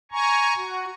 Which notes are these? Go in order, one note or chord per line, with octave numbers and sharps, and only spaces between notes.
G#5 A#5 C#6
F#4